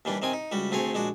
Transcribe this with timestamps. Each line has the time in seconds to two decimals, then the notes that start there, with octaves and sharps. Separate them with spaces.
0.05 D#2 E3 G3 D4
0.22 C3 D#3 C4 G#5 D#6
0.33 D#4
0.52 C#2 G3 F#4
0.71 D2 A3 C4 G#4 C#5
0.93 A#1 G#3 D4 F#4